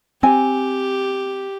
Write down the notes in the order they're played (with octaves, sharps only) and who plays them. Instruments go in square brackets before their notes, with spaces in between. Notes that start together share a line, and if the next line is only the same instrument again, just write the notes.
[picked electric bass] C4 [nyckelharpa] G4 [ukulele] G#5